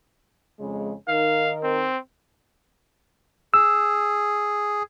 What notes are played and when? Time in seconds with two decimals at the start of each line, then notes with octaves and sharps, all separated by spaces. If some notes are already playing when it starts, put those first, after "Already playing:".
0.60 F2 C#3 G#3
1.08 D#3 D#4 A#4 F5
1.63 C4
3.54 G#4 E6